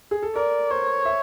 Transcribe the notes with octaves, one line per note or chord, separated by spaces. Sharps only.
G#4
A4
A#4 D5
C5 C#5
E5